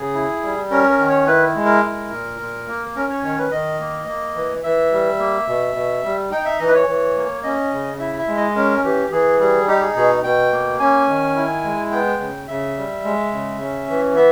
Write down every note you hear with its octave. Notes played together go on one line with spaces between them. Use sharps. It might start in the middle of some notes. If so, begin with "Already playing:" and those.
Already playing: C#3 G#4
E4
G3
C#4 A#4
A#4
D#3
C#5
E4 B4
G#3
A#4
E4
A#2
A#2
A#3
C#4 A#4
C#5
D#3 C#5
B4
D#3 D#5
A#3
A#3
E3
E3 E5
G3
A#3
B2
B2
G3
D#4 G5
E5
E3 D#5
B4
C#5
E3
A#3
C#4 D#5
C#3
E4 E5
E5
G#3
D#5
C#4 A#4
E3 G4
E3 G#4
G3 G#4
D#4 G4
G#4
B2 G#4
B2 G5
A#3
C#4 G#5
D#3
E4
G#3
B3 G5
C#3
C#3 E5
G3
G#3
C#3
C#4
E3
B3 E5